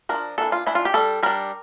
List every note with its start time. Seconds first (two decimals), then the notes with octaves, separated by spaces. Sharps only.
0.09 A#3 D4 A#4
0.14 F3
0.38 E3 A#3 D4 A4
0.52 F4
0.66 E3 A#3 D4 E4
0.75 F4
0.85 G4
0.94 G3 D4 A4
1.23 G3 D4 A#4